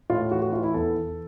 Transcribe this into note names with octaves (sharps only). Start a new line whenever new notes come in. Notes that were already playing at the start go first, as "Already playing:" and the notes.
A2 F4
E3 F#4
F#4
E3 F4
E4
E2 A4
E3